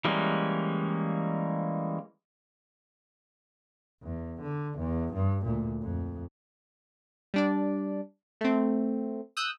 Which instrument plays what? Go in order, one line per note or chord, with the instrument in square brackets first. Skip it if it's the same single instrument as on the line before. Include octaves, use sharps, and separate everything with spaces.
[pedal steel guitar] E3 G3 G#3 A#3 C#4
[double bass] E2
D3
E2
G2
D2 A#2
F2
[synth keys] G3 D4 D5
A3 C4
D#6 E6 F#6 G6